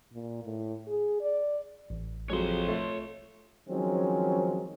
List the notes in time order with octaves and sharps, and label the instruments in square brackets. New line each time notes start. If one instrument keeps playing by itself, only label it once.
[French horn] A#2
A2
G#4
D5
[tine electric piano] A1
[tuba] F2 [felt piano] F#3 G#3 [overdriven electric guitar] C#5 C6
[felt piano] A3 F4
[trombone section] D#3 F3 F#3 G#3 C4 C#4